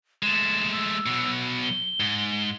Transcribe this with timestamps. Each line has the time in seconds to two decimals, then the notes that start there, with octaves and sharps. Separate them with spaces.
0.23 G#3 A3 E7
0.73 E6
1.06 B2 F#3
1.63 G7
2.00 G#2